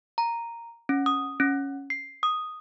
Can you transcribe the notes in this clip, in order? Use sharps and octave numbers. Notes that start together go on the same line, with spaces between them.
A#5
C#4
D#6
C#4
C7
D#6